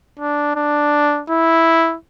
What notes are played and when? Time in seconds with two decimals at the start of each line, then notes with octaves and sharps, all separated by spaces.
0.19 D4
0.56 D4
1.30 E4